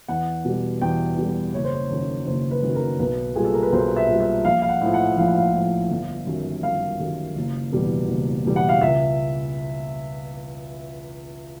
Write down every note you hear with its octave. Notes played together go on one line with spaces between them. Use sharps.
E2 F#5
B2 G3
E2 G5
B2 G3
F#1 C#5
C5
C#5
F#2 D#3 F#3
F#1 C5
B4
F#2 D#3 F#3
A#4
B1 B4
A#2 G3 G#4
A4
A#4
B4
B1 C5
E5
A#2 G3
E5
A#1 F5
F5
F#5
A2 F3
F#5
A#1 F5
F#5
F5
A2 F3
G1
F#2 D#3 G3
G1 F5
F#2 D#3 G3
F#1
E2 B2 G3
F#1
E2 B2 G3
F#5
F5
C#2 E5